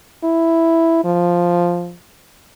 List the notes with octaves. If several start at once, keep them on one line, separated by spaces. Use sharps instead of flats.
E4
F3